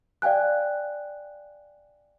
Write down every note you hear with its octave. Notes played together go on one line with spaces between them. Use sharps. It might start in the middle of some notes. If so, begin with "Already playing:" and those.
D5 F5 G5 G#5 F#6